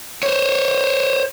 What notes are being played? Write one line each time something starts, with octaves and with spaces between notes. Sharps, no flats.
C5 C#5